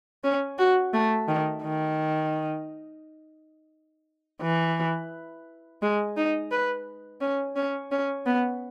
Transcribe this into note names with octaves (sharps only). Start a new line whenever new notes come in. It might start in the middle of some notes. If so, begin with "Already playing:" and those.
C#4
F#4
A3
D#3
D#3
E3
G#3
D#4
B4
C#4
C#4
C#4
B3